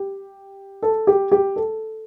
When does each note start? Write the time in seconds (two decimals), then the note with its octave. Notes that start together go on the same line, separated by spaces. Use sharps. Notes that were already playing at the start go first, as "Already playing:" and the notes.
Already playing: G4
0.82 A4
1.07 G4
1.32 G4
1.56 A4